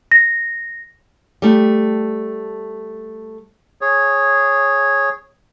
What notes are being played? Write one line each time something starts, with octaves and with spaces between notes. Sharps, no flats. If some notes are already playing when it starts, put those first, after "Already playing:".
A#6
G3 A3 G4
G#4 C#5